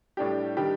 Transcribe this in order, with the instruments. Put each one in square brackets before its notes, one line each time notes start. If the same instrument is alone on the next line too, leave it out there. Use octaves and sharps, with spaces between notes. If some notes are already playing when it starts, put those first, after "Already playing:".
[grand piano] A2 G3 D4 G4
D#3 G3 D4 G4